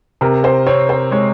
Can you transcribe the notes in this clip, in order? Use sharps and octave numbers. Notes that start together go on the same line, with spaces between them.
C3 A#4
C5
C4 C#5
C5
G#3 C#5